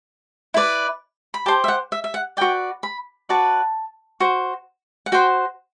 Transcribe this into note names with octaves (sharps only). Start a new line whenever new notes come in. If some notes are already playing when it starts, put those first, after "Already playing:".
E4 B4 D5
B5
G4 C5 A5
E5
F#5
E5
E5
F#5
F#4 B4 D5 G5
B5
F#4 B4 D5 A5
F#4 C5
F#5
F#4 C5 G5